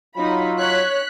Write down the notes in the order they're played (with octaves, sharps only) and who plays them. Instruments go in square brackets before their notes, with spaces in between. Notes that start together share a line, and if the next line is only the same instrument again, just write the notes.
[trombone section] F#3 F4 [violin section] D#4 B5
[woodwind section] C#5 [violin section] F#6 B6